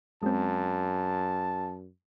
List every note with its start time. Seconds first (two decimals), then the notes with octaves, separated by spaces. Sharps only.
0.23 F#2 G#3 C4 A5